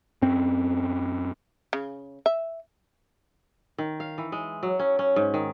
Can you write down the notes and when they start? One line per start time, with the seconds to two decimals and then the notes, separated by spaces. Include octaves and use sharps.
0.22 F#2 C4
1.73 C#3
2.26 E5
3.78 D#3
4.00 F5
4.18 E3
4.32 G#3
4.63 F#3
4.79 C#4
4.99 C#4
5.16 G#2
5.34 D#3